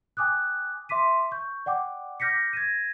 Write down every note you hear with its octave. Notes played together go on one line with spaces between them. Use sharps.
G5 G#5 D6 D#6 F#6
E5 C6 D6 B6 D#7
C#6 G6
D5 F#5 G5 D6
D6 F6 G6 A#6 B6 C#7
G#6 A#6 D#7